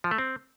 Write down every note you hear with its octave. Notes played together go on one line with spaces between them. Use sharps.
F3
A3
C4